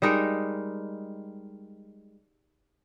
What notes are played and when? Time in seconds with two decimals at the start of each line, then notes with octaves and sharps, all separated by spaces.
0.02 G3 G#3 D#4 A#4